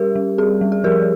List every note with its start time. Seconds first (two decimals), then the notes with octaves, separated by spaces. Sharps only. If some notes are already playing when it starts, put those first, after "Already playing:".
Already playing: G3 G4 A#4
0.16 G3
0.38 C4 G#4
0.61 G3
0.72 G#4
0.84 F3 G4 A#4